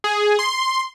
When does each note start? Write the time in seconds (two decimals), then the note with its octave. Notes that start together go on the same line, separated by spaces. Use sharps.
0.04 G#4
0.39 C6